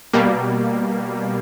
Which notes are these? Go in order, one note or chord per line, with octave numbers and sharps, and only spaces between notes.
B2 G3 A#3